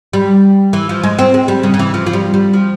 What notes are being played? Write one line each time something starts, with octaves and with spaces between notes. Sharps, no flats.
G3
E3
F3
G#3
C4
G#3
G3
C#3
C#3
E3
F3
F3
G3
G3
F3